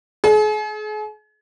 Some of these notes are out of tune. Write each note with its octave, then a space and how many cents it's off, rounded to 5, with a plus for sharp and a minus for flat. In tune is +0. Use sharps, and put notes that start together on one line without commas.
G#4 +40